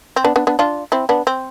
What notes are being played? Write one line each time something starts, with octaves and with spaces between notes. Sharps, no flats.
C4
B3 D4
B3 D4
B3 D4
D4 F4
C4 E4
B3 D4
C4